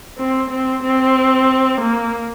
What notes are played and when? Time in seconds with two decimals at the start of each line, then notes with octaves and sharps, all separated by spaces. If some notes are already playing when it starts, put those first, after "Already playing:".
0.19 C4
0.50 C4
0.83 C4
1.81 A#3